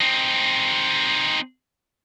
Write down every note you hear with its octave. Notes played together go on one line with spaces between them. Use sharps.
C4 D#4